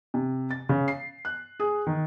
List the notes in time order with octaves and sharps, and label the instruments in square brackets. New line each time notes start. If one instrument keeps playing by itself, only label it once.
[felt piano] C3
A6
C#3
C7
F#6
G#4
D#3